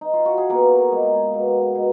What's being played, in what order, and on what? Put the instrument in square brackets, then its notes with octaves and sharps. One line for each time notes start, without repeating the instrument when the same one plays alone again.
[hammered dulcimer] D#4
F4
F#4
G#4
A#3 B3 A#4
G#3
B2
B2